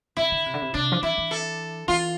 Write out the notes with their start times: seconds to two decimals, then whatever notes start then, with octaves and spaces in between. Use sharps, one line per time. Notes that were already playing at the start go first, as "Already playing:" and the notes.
0.17 D3 E4
0.32 D3
0.46 C3
0.54 D3
0.62 C3
0.74 C3 D4
0.92 F3
1.02 E3 E4
1.18 E3
1.31 A4
1.88 E3 F4